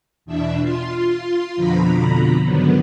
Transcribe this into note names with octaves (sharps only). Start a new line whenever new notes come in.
E2 B2 D4 E5
F4 C6
F2 B2 D3 F3 A#5 B5
G#2 D3 D#3 F#3 B3